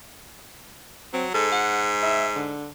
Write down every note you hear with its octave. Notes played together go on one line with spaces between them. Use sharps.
F#3 C4
G#2 A4
F#5
E5
D3